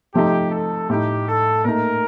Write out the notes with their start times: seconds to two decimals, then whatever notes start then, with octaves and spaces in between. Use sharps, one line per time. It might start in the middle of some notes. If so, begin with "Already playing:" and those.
0.14 C3 F3 A3 D#4 G4
0.52 A4
0.89 A2 A3 D#4 G4
1.27 A4
1.65 A#2 A3 D#4 A#4